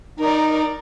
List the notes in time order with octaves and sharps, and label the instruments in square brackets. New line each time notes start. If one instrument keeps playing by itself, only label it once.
[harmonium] D#4 [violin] A#4 D5